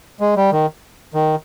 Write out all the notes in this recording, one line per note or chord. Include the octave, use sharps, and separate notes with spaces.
G#3
G3
D#3
D#3